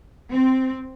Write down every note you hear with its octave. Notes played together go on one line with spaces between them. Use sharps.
C4